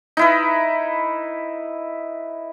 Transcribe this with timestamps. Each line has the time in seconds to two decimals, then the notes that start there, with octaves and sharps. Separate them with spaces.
0.17 D#4 E4 B4